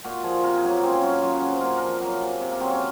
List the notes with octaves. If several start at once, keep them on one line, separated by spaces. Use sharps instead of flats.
A#2 F#4
F3 G#4
C3 A#4
G#4
F#3
A#3
C#3 C4
C4
F#3 C#4
F#3 F4
F#4
C3 G#4
C5
A#2 A#4
G#4
F3 A#4
F#3
C3
C3
A#3
F#3 C4
C#4